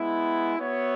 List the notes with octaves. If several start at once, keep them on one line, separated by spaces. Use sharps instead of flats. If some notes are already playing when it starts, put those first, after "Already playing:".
Already playing: G#3 B3 E4
B3 F#4 C#5 E5